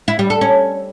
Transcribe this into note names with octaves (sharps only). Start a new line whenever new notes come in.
E4
G3
A4
C#4